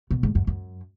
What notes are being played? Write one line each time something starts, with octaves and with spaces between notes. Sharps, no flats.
B2
G#2
F#2
F#2